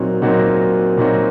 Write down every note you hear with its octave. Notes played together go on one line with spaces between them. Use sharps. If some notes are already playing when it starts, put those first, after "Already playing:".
Already playing: A#2 F#3 C4 D#4 F#4
A#2 F#3 C4 D#4 F#4
A#2 F#3 C4 D#4 F#4